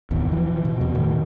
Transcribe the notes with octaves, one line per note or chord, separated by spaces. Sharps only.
G#1 E2 B2
E3 F3
B2
E2 B2 E3
A2 D#3